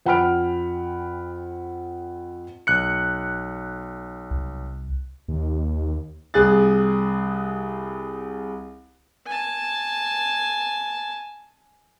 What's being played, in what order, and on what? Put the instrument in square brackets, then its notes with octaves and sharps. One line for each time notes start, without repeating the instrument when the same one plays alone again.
[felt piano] F2 F#5 G5 B5 F6 D7
[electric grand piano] B1 F#6 C#7
[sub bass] C2
[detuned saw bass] D#2
[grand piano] C2 G#4 F#6 A6
[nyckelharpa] G#5 A5